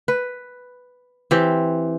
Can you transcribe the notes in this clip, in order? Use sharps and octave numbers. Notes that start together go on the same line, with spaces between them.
B4
E3 C4 G4